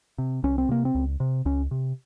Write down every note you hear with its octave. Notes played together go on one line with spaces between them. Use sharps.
C3
C2 C#4
C4
C3 A#3
C4
C#2
C3
C#2 C#4
C3